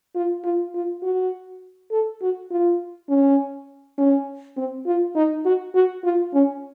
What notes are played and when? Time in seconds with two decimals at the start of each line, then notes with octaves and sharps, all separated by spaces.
0.15 F4
0.44 F4
0.74 F4
1.03 F#4
1.91 A4
2.22 F#4
2.51 F4
3.09 C#4
3.98 C#4
4.57 C4
4.86 F4
5.15 D#4
5.45 F#4
5.75 F#4
6.04 F4
6.33 C#4